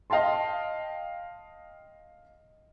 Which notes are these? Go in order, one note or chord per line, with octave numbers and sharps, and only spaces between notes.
D#5 F5 G5 A5 C6